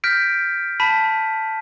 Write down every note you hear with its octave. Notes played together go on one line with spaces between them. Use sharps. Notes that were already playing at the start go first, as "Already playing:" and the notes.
F6 G6 A#6 B6 D7
A5 B5 B6 D#7